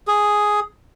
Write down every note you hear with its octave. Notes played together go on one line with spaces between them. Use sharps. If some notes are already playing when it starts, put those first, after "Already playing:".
G#4